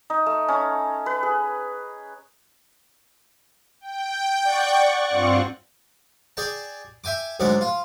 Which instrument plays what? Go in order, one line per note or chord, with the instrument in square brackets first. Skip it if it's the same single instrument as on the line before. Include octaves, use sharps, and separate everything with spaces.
[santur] D#4
A3
C#4
B4
G#4
[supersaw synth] G5
[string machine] D5 F#5 C#6
[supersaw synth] G2 C4 F4
[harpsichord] G#4 D5 G5 A5
E5 G5 G#5 D6
D2 G#2 F#3 D5 D6
F4